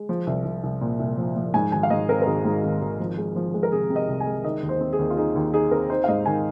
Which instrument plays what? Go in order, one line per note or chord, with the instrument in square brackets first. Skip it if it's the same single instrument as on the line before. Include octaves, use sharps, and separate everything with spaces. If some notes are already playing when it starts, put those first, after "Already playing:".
Already playing: [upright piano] G#3
F3
C2
C2
C2
A#2
C2
F3
F3
G#2 G#5
G#1 G#5
F5
G#2 D#5
C4 A#4
A#4
G#1 G#4
G#2
G#1
G#1
F3
G#3
F3
G#3
A#4
C3 G#4
C3
D#5
C2
G#5
G#3
D#3 D#5
D#2
C5
C4
G#4
D#2
F4
D#4 G#4
D#2
D#4 G#4
C4 A#4
D#4 C5
F5
G#2 D#5
D#3 G#5